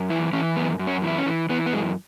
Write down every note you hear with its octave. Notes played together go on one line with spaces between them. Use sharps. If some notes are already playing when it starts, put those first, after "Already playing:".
Already playing: F#2
E3 E4
E3 C#4
F#2 B3
F#2
C#4
E3 E4
C#4
E3
E3 B3
B3
F#2 G#3